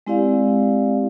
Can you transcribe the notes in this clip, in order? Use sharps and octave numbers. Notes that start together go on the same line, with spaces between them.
G#3 C4 E4 G4 D5 F5